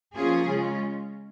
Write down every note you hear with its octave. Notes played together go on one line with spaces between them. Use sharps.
F3 A#3 C#4 F4 G#4
C#3 G#3 C#4 F4